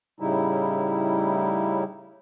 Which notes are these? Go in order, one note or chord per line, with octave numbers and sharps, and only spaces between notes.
A2 C#3 G3 D#4 E4